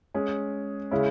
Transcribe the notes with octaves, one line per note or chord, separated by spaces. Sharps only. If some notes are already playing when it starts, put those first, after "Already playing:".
G#3 C#4 G#4
C#3 G#3 C#4 E4